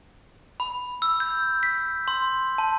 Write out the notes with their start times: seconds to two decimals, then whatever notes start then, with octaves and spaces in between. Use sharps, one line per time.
0.60 B5
1.02 E6
1.20 G6
1.63 B6
2.08 C6
2.58 A5